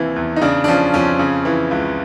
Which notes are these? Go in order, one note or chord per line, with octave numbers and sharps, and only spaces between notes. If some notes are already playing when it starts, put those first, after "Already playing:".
Already playing: D#2 C3 E3
E2
D#4
C#3 D4
D4
F3 C#4
F2 C#4
C#3
E3
C#2